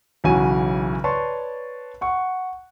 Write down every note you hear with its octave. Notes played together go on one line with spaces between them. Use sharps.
B1 C#3 E3 F#4 G#5 D#7
B4 C#5 D5 A5 C6 C#6
F#5 C#6